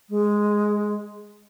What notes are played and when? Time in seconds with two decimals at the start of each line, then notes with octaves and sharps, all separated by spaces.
0.10 G#3